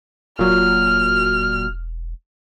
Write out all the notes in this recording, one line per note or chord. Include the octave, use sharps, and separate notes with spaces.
E1 A#2 F#3 F6